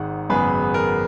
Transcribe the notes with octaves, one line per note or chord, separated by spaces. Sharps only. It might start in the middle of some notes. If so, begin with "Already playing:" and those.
Already playing: G#1 G#2 D#3 G#3 F#5
G#1 F#2 C#3 G#3 B3 G#4 B4
A#4